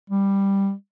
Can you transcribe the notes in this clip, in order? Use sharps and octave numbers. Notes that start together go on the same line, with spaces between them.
G3